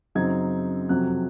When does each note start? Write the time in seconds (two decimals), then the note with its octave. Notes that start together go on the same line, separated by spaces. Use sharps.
0.15 F#2 C#3 F#3 C4 D#4 G#6
0.89 F2 C3 F#3 F#6